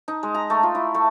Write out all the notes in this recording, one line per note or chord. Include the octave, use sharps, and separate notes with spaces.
D#4
G#3
A#5
A3
F4
E4
A3